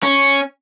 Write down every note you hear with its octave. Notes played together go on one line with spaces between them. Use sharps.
C#4